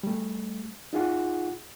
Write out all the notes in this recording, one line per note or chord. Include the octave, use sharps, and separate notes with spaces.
G3 A3
D#4 F4 G#4 F#5